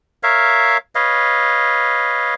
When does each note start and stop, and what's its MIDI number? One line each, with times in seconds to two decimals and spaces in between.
0.23 0.77 70
0.23 0.77 73
0.23 0.77 76
0.23 0.77 77
0.95 2.34 71
0.95 2.34 73
0.95 2.34 75
0.95 2.34 77